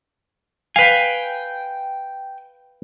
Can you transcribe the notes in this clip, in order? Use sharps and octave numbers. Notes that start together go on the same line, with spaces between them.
B4 F5 G5 G#5